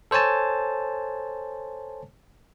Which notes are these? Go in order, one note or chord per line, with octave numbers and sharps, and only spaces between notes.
A4 C5 C#5 G#5 A5